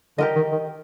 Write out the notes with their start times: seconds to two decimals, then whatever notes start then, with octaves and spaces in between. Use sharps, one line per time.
0.18 D3 G4 A#4 D#5
0.36 D#3
0.52 D#3